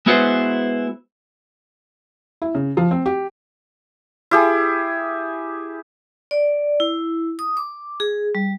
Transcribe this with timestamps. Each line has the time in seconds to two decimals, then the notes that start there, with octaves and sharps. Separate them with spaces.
0.06 G#3 B3 E4 F#4 B4 C5
2.42 E4
2.55 C#3
2.77 F3
2.91 C4
3.06 G4
4.31 E4 G4 G#4
6.31 D5
6.80 E4
7.39 D#6
7.57 D6
8.00 G#4
8.35 G3